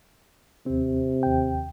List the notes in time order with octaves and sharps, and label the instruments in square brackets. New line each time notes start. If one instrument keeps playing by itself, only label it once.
[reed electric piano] D#2 C4 [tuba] C3
[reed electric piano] D#2 G5